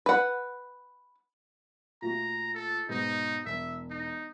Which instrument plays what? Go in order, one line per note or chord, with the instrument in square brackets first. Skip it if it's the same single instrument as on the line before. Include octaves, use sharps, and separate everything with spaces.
[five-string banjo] B4 F#5
[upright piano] A#2 A3 F#4 [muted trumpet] A#5
[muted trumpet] A4
[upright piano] G#2 B2 [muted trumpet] D#4
[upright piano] E1 [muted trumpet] E5
[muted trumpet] D#4